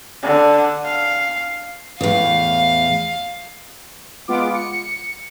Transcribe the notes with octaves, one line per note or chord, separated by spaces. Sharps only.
D3
F5
E2 A2 F5
G#3 B3 F4 D6
C#7